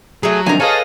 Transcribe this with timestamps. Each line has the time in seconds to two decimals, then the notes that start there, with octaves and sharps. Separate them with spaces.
0.23 F#3 A3 G#4
0.46 A2 D#3 F3 C4 D4 G#5 A#5
0.60 F#4 G#4 A4 B4 C#5 D#5 F5 G#5